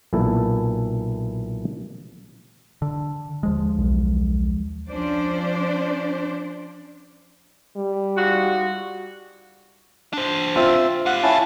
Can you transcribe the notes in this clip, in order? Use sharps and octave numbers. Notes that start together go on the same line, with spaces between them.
B1 A#2 E3 E4 A4
D3
D#2 F3 G#3
B1
F3 C#4 D4 C5 D5
G3
G#2 F4 F#4
D4 C5
C4 F4 E5
G4 F5 F#5
C#4 E4 A5